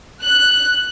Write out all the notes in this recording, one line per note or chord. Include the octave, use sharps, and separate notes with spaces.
F#6